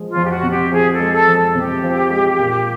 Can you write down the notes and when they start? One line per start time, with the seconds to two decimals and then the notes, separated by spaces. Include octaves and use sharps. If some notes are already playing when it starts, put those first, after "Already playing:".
Already playing: F3 G#3
0.09 F4
0.16 F2
0.23 G4
0.29 F#4
0.43 C3
0.50 G4
0.71 F3 G#4
0.93 A4
1.00 G#3
1.13 A4
1.28 F2
1.55 C3 G4
1.83 F3
2.10 G#3
2.39 A#2